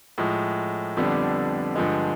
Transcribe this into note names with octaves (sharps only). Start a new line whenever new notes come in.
A2 F3 G#3
F2 D3 G3 B3 D4
G2 D3 F3 G#3